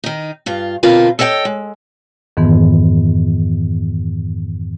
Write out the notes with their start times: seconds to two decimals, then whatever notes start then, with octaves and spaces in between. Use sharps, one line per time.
0.04 D#3 D#4
0.46 G2 F4
0.83 B2 D3 C4 F4 A#4 B4
1.19 A4 C#5 D#5 F#5 G5
1.45 G#3
2.37 F2 G#2 D#3 E3 B3